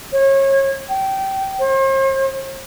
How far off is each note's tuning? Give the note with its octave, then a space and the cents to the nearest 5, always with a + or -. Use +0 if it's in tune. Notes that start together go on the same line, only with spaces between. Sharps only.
C#5 -30
G5 -20
C5 +45